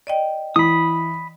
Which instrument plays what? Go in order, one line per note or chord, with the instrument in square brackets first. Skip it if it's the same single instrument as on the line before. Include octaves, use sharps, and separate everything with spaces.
[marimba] D5 D#5 G5
[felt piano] E3 [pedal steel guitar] B5 D#6